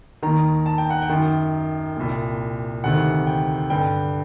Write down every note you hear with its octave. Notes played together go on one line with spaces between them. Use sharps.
D#2 D#3 A#5
A5
G5
F#5
G5
F#2 D#3
C2 A#2
D2 C3 D#3 F#5
G5
G2 D3 G5